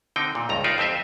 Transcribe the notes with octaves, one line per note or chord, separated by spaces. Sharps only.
D3 C4 D#4 G5
A#2
C#2 G2 A#5
D#4 F4 B4 D5 E5
F2 C4 G4 C5 E5